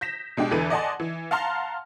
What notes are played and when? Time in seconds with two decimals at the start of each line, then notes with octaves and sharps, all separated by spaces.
0.01 G6 A#6 B6 E7
0.37 B2 G#3 D4 G4
0.51 E2 D3 E3 A4 B4 D#7
0.70 D5 D#5 F#5 G#5 A5 C6
1.00 E3
1.31 F5 F#5 A5 A#5 C6 F6